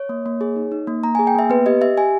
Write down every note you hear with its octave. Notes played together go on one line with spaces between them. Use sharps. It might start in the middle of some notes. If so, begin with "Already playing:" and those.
Already playing: C#5
A#3
A#3
G#4
D#4
D#4
A#3
A#3 A#5
G#4 G#5
G5
A#3 E5
B3 B4
G4 D#5
G4 E5
G4 G#5